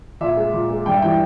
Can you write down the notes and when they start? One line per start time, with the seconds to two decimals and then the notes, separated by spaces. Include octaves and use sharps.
0.21 A#2 E5
0.37 G#3
0.53 A#2
0.70 G#3
0.86 G2 G5
0.94 E5
1.02 E3 G3 G5